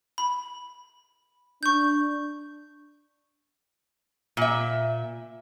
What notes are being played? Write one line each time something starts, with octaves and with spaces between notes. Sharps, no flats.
B5
D4 C#6 G6
A#2 E5